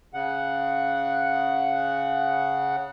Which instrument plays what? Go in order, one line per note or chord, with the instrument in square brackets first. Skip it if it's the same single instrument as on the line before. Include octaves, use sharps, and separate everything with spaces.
[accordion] C#3 F#5